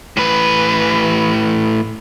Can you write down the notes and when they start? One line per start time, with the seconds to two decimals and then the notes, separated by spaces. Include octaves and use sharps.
0.17 A2 B4